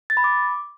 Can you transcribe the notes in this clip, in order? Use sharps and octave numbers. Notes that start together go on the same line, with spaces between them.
A6
B5
D6